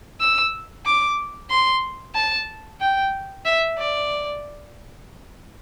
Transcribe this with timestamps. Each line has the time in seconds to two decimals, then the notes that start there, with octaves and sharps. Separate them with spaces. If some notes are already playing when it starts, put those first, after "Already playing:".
0.21 E6
0.86 D6
1.50 C6
2.15 A5
2.81 G5
3.45 E5
3.78 D5